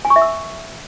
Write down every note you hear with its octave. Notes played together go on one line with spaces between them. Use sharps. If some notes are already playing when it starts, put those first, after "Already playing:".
G#5
C#6
E5
E6